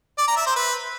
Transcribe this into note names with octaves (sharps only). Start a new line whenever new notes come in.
D5
A#5
E5
C5
B4